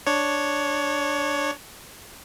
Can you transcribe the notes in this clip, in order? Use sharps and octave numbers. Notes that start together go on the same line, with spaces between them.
D4 C#5